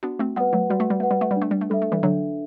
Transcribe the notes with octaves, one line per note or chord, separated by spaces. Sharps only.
B3 D4 F#4
A3 C4
G3 B3 B4 F#5
F#3 A3
G3 F#4
A3
G3
A3 B4 F#5
G3
A3
G3
D4
A3
G3
A3
G3 A4 E5
A3
E3 G3
D3 F#3 D4